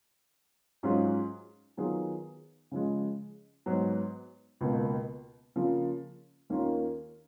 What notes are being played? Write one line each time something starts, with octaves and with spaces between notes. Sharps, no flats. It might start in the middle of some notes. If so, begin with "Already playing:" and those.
G#2 F#3 C#4 F4 G#4
D#3 F#3 B3 F4 G#4
C#3 F3 G#3
G#2 F#3 B3
C#2 B2 A#3
C#3 F3 A#3 F4
D#2 D#3 A#3 C#4 F4